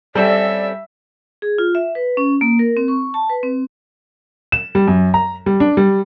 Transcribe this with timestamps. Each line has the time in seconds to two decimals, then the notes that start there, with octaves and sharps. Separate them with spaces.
0.15 G3 C4 C#4 A4 D5 E5
1.42 G#4
1.58 F4
1.75 E5
1.95 B4
2.17 C#4
2.41 A#3
2.59 A#4
2.77 C4
2.88 C#6
3.14 A5
3.30 B4
3.43 C4
4.52 E7
4.75 G3
4.88 F#2
5.14 A#5
5.46 G3
5.60 D4
5.77 G3